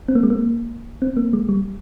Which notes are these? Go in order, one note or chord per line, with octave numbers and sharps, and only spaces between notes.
C4
A#3
G#3
A#3
C4
A#3
G#3
G3